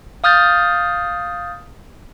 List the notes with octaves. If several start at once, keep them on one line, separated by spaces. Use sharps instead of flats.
F5 D#6 F6 G6 A6